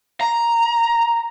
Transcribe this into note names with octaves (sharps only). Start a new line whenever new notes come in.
A#5